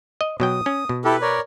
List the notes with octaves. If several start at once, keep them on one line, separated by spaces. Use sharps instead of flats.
D#5
B2 F#3 G5 D#6
C#4
B2
E4 G4 A4 B4
A#4 C#5 D5